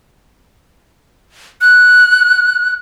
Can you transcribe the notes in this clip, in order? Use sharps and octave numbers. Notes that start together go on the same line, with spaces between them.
F#6